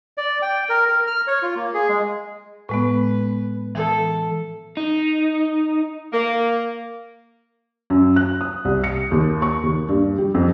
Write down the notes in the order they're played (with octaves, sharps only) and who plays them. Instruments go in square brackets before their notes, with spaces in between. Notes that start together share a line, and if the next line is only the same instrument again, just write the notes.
[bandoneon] D5
G5
A#4
A#4
F6
C#5
F4
A#3
G#4
G#3
[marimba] A2 G#3 B3 [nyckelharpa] B4
[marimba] E3 [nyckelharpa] A4
[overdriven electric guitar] D#4
[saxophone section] A#3
[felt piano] F#2
F#6
D#6
C2
C#7
D#2
C#6
D#2
G2
G3
F2